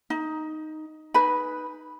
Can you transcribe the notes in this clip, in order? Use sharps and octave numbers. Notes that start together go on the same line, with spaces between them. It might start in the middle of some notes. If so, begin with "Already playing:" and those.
D#4
D#4 B4 G#5 B5